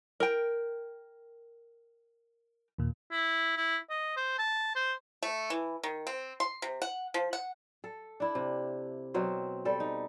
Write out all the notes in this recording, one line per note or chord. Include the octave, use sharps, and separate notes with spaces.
A#4 G5
D#2 A#2
E4
E4
D#5
C5
A5
C5
A3
E3
D#3
C4
C6
C3
F#5
F3
F#5
A4
D4 E4
C3
B2 F#3 C4
G3 A4
D#4